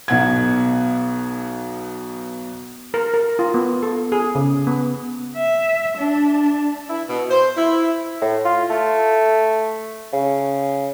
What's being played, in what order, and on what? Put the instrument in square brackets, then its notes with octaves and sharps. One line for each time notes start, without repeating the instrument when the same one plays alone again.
[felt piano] B1 B2 F#5 G#6
[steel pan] A#4
A#4
F4
B3
A4
G#4
C#3
B3
[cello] E5
D4
[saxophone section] E4
B2
C5
E4
[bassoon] A2
F4
A3
C#3